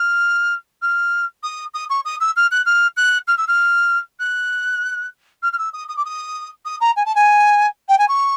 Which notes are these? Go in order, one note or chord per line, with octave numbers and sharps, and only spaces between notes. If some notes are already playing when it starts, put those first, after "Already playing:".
Already playing: F6
F6
D#6
D#6
C#6
D#6
E6
F6
F#6
F6
F#6
F6
E6
F6
F#6
F6
F6
E6
D#6
D#6
D6
D#6
D#6
A#5
G#5
A5
G#5
G5
G#5
C#6